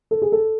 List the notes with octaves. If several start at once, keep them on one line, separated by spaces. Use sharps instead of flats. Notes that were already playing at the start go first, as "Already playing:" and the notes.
A4
G#4
A4